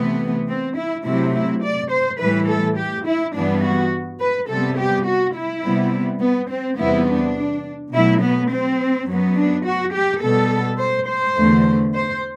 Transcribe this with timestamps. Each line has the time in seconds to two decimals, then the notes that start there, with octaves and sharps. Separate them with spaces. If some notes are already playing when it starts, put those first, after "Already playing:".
Already playing: C3 E3 A3 B3
0.48 C4
0.77 E4
1.05 C3 F#3 A3 E4
1.34 E4
1.63 D5
1.91 C5
2.19 A2 E3 G3 B4
2.48 A4
2.77 G4
3.06 E4
3.35 G2 E3 G3 B3 D4
3.64 F#4
4.20 B4
4.49 C3 G3 B3 A4
4.78 G4
5.06 F#4
5.35 E4
5.64 C3 G3 B3
6.21 B3
6.50 C4
6.79 E2 C3 G3 B3 E4
7.07 D4
7.93 B2 F#3 A3 E4
8.22 B3
8.50 C4
9.07 F#2 F#3 B3
9.36 D4
9.65 F#4
9.94 G4
10.22 B2 G3 B3 A4
10.80 C5
11.08 C5
11.36 E2 D3 A3
11.94 C5